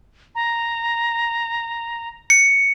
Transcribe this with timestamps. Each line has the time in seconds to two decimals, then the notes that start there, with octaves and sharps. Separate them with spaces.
0.35 A#5
2.30 C#7